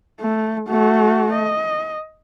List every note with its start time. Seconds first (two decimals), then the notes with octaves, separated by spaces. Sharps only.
0.20 A3
0.69 A3 F#4
1.33 D#5